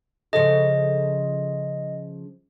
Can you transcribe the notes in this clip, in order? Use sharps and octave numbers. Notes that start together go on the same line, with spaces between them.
C#3 F3 A4 D#5